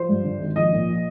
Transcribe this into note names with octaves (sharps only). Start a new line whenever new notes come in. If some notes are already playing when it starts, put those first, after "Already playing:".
Already playing: F3 C5
G2
D3
G#1
A#1 D#5
A#2
F3